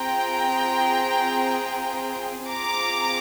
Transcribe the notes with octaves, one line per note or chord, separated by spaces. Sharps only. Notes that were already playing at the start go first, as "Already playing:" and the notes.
Already playing: C4 F4 G#4 G5 A#5
C4 F4 G#4 A#5 D6